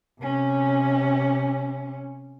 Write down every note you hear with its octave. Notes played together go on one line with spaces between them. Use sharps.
C3 C#4